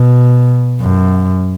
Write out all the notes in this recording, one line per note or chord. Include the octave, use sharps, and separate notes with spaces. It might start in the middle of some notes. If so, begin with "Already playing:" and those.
Already playing: B2
F#2